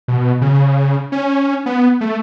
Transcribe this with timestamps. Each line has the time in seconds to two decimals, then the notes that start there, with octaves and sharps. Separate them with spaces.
0.08 B2
0.41 C#3
1.12 C#4
1.66 B3
2.01 A3